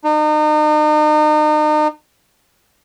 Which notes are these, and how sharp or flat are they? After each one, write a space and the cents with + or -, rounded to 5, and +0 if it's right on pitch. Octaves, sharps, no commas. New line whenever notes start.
D#4 -40